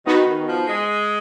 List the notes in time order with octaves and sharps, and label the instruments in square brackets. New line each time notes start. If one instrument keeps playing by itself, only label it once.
[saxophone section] D#3 [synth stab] B3 D#4 F#4 B4
[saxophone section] D#3
F3
G#3